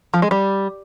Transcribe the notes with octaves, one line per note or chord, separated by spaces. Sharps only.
F3
G#3
G3